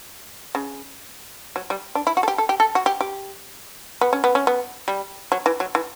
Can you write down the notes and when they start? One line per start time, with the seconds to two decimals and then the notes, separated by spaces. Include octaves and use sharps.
0.55 C#3
1.56 F#3
1.70 G3
1.95 D4
2.07 E4
2.17 F#4
2.23 A4
2.28 G4
2.38 A4
2.49 G4
2.60 A4
2.75 F#4
2.86 G4
3.01 G4
4.01 B3
4.13 C#4
4.24 B3
4.35 C#4
4.47 B3
4.88 G3
5.32 F#3
5.46 E3
5.60 F#3
5.75 E3